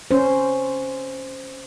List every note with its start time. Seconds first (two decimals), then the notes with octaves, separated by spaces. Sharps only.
0.11 C#4 C5